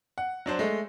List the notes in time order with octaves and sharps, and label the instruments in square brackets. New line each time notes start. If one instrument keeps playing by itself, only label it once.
[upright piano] F#5
F#3 D4 C5
G#3 A3